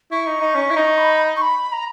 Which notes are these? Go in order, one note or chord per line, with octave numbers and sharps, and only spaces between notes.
E4 C#6
D#4
D#4
C#4
E4
D#4
B5
C#6
B5
A#5